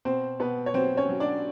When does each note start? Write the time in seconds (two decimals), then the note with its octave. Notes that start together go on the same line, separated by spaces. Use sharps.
0.05 B2 C4 C5
0.40 B2 B3 B4
0.66 C#5
0.74 F#3 C4 C5
0.97 C#4 C#5
1.09 F#3
1.20 D4 D5